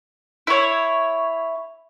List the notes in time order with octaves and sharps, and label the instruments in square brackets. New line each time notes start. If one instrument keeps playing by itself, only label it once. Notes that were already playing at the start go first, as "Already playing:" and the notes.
[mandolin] E4 C#5